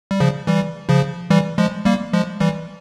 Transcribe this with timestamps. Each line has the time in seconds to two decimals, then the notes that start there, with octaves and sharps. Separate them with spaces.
0.11 G3
0.20 C#3 F3
0.47 E3 G3
0.89 C#3 F3
1.30 E3 G3
1.58 F3 G#3
1.85 G3 A#3
2.13 F3 G#3
2.40 E3 G3